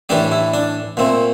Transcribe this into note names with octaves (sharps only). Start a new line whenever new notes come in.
A2 E3 A3 D4 G4
E4
D4
A#2 A3 C4